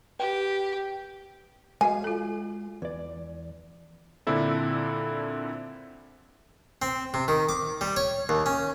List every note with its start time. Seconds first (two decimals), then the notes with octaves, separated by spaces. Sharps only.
0.20 G4 B4 G5
1.81 G#3 F#4 D#5 F5 G#5
2.04 F4 A4
2.82 E2 B4 D5
4.27 A#2 D3 C4 D4 E4 A4
6.82 C4
7.14 C3
7.28 D#3
7.49 D6
7.81 G3
7.96 C#5
8.29 D#2
8.46 C#4